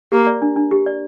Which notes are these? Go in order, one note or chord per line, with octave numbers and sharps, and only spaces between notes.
A#3 G4
D5
D4
D4
G4
D5